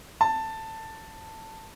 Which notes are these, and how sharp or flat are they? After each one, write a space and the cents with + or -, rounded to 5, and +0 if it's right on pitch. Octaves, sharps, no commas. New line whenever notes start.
A5 +10